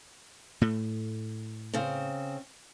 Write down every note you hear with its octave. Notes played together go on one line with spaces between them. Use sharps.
A2 A3
C#3 C4